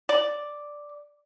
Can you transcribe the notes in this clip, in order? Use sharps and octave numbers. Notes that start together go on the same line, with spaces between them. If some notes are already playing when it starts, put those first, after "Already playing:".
D5